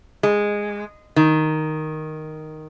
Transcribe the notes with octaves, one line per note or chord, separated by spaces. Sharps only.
G#3
D#3